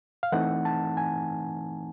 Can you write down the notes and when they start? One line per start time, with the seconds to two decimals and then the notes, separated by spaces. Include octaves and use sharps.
0.23 F5
0.32 E3 A3 C4 D#4 F#5
0.65 A5
0.97 G#5